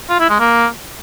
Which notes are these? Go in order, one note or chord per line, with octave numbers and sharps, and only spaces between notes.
F4
E4
G#3
A#3